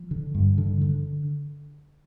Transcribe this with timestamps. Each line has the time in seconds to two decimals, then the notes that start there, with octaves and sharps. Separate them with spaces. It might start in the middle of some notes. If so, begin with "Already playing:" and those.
Already playing: F3
0.11 D3
0.35 G2
0.58 D3
0.81 D3